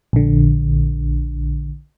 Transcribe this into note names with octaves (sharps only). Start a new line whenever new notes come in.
A#1 D3